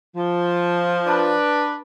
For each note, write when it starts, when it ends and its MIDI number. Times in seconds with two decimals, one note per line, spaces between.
0.16 1.35 53
1.06 1.80 62
1.06 1.80 71